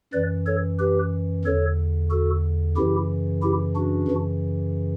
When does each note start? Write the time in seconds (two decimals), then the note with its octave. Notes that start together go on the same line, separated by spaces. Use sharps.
0.13 F#2 E3 B4 D5
0.46 A4 C#5
0.79 G4 B4
1.45 E2 D3 A4 C#5
2.10 F#4 A4
2.76 F#2 C#3 E3 E4 G4
3.42 E4 G4
3.75 D4 F#4
4.08 F#2 C#3 E3